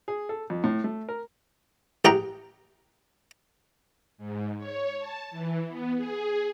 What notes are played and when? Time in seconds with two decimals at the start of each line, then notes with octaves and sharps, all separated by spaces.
0.08 G#4
0.29 A4
0.50 F2
0.64 A2
0.84 A3
1.09 A#4
2.05 A1 G4 G#4 F#5 G5 A#5
4.18 G#2
4.58 C#5
5.00 A5
5.31 E3
5.68 B3
5.97 G#4